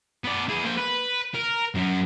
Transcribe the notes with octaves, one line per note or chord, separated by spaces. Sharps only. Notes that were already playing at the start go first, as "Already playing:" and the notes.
B3 D5
E4 G#4
A#3 C5
B4
A#4
F#2